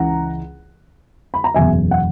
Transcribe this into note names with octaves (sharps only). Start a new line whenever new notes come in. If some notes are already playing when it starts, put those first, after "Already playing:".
Already playing: C#2 C#3 E3 F#5 A#5
B5
A#5
F#1 E2 B2 F#3 E5 G#5
F#5